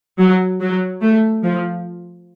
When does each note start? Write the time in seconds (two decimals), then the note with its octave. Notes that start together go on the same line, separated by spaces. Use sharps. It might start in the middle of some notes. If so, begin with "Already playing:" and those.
0.19 F#3
0.60 F#3
1.01 A3
1.43 F3